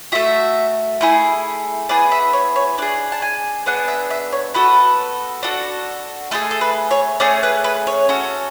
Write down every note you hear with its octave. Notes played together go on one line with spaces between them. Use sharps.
A3 C#4 F#4 E5
A3 E4 G#4
B3 E4 G#4 D5
E5
C#5
C#5
D4 G#4 D5
A5
G#5
B3 D4 G#4 F#5
E5
E5
C#5
B3 F#4 A4 B4
D4 F#4 A4
A3 E4 G#4 A4
A4
B4
C#5
A3 C#4 G#4 D5
B4
B4
C#5
C#4 F#4 A4